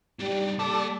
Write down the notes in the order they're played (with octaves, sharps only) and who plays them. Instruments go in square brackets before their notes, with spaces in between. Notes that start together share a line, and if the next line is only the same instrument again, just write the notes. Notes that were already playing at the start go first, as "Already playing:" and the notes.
[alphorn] G3 [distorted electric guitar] D4 D#4
[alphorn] G3 [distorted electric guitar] A#3 A5 [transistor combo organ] A4 D5